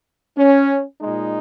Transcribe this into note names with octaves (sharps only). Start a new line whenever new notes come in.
C#4
A#2 G#3 D#4